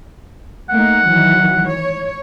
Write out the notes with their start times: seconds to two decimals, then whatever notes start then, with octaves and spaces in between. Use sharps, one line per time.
0.70 A3 A#3 D#4 F#5
1.06 D#3 E3 F#3
1.66 C#5